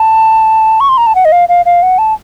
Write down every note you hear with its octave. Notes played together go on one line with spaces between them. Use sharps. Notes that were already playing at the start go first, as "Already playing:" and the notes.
Already playing: A5
C#6
C6
A#5
A5
F#5
D#5
F5
F5
F5
F#5
A5